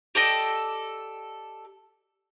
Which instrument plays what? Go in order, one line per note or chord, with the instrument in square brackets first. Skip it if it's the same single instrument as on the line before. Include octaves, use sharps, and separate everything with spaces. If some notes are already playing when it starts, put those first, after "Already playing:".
[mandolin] G4 A4 D5 D#5